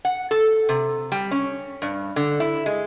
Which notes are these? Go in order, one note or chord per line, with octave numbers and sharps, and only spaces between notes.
F#5
A4
C3
G3
C#4
G2
D3
E4
G#3